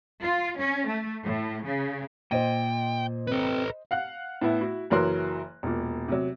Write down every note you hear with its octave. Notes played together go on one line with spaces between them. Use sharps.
F4
C#4
A3
A2
C#3
A#2 C5 D#5 G5 D#7
C4 A4 B4
F5 F#5 F#6
A2 B3 E4
E4 F#4
F#1 E3 F#3 A#4 C6 F#6
E1 A#2
C3 F#3